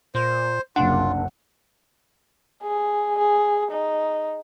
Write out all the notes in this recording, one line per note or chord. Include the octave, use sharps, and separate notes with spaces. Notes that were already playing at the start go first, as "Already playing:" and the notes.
A#2 C5
F#1 C2 F#2 D4 F4 F#5
G#4
G#4
D#4